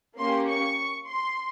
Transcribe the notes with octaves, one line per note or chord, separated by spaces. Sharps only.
A#3 C#4 G4 C6
C#6
C6